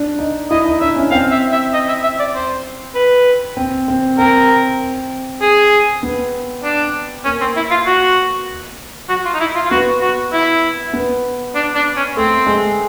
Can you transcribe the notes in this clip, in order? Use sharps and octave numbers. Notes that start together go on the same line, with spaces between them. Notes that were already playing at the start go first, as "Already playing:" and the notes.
Already playing: D4
D#4
E4 D#5
D#4
D4 E5
C#4
C4 F5
E5
E5
D#5
E5
E5
D5
C5
B4
C4
C4
C4 A#4
G#4
B3
D4
A#3 C#4
C4
E4
F4
F#4
F#4
F4
D#4
E4
F4
F4
B3 F#4
F#4
E4
B3
D4
D4
C#4
A3 C4
G#3